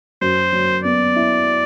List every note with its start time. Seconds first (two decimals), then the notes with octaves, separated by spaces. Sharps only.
0.21 F#2 C5
0.53 F#3
0.84 B3 D5
1.16 E4